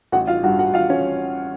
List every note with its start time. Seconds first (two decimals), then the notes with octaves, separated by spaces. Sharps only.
0.12 A1 F#4 F#5
0.27 F4 F5
0.43 G2 F#4 F#5
0.59 F#4 F#5
0.74 G2 F4 F5
0.89 C#4 C#5